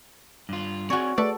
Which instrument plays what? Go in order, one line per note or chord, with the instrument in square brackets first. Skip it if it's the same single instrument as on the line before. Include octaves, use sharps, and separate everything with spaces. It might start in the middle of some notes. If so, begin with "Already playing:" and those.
[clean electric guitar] G2 F4
[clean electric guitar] C4 D5 G#5 [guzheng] F#4 C#5
[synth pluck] A3 B4 C#6 [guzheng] A4 [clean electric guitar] D5